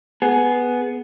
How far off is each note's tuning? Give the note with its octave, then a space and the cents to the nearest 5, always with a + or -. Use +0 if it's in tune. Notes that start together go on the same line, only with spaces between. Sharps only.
B3 +0 G#4 +15